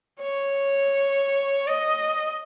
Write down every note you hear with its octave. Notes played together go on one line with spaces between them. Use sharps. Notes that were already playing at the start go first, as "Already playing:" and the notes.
C#5
D#5